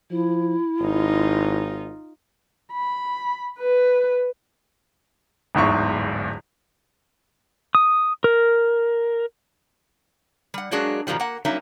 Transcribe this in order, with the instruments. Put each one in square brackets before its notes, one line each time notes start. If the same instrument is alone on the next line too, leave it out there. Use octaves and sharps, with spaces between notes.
[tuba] F3 [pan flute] E4
[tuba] G#1 [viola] D#4 F4
[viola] B5
B4
[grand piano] D1 G1 E2 G#2 E4 C#6
[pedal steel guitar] D#6
A#4
[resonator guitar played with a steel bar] G3 F#5
F#3 G#3 A#3 D4 F#4 G#4
G#2 B2 D#3 F3 G3
A#3 F#5
F#3 G3 A#3 C#4 D#4 E5